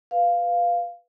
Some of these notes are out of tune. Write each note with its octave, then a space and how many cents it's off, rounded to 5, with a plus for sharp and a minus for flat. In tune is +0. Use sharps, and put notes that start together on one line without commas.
B4 +0 F5 +0